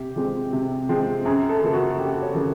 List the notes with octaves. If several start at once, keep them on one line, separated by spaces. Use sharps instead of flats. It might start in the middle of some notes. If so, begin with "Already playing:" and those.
Already playing: C3 G4
F3 G#3 C4
C3
F3 G#3 C4
F#2 G#4
A4
C#3 F3 A#3
F#4
F#2 G4
C#5
C#3 F3 A#3